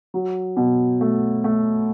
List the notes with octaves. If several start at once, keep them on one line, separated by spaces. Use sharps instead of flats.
F#3
B2
A3
A3